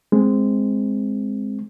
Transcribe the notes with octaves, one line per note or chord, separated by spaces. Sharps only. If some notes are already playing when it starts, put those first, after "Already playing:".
G#3 C4